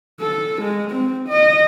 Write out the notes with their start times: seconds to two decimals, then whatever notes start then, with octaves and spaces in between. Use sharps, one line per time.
0.21 A4
0.62 G#3
0.92 C4
1.29 D#5